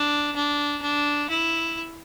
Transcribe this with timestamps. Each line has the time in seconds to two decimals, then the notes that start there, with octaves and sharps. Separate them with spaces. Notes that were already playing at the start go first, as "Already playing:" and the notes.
Already playing: D4
0.36 D4
0.82 D4
1.30 E4